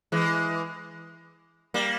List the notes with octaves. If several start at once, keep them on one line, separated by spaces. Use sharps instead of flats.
E3 G#3
G3 A#3